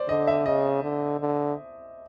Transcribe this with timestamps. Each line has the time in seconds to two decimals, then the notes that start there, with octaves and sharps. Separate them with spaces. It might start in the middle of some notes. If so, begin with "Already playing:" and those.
Already playing: C5 D5
0.09 D3 D#5
0.27 E5
0.46 C#3 D#5
0.83 D3
1.20 D3